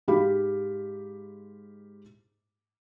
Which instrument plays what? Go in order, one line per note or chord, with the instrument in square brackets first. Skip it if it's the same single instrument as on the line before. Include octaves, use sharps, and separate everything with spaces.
[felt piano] G#2 G#3 G4 F5 B5 D6